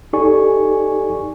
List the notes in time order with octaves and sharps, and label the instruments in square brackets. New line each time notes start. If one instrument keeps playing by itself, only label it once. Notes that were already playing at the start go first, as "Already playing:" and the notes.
[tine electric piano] D#4 G4 A4 D5 G#5 C#6